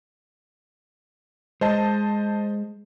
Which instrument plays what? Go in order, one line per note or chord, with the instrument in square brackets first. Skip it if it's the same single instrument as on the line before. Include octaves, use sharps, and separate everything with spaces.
[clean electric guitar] G#3 [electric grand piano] C5 D#5 A5